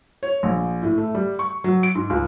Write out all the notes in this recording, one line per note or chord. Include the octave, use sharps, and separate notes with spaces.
C#5
A#1
A2
A3
G3
C#6
F#3
D7
G#2
C#2